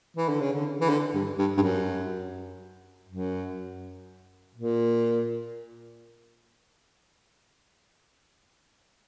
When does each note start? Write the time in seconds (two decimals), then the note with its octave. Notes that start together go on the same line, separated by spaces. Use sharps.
0.17 E3
0.29 D3
0.40 C#3
0.53 D3
0.80 E3
0.90 D3
1.14 G2
1.38 G2
1.57 G2
1.62 F#2
3.08 F#2
4.55 A#2